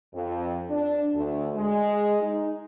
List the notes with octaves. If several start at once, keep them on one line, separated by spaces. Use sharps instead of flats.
F2
D4
D2
G#3
D#4